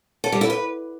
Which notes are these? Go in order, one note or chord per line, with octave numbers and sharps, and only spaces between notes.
A4
G3
E4
B4